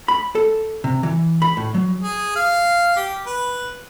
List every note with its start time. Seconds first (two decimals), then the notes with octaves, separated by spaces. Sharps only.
0.08 B5
0.35 A4
0.84 C3
1.03 E3
1.42 B5
1.57 A2
1.74 F#3
2.02 G#4
2.36 F5
2.96 G4
3.26 B4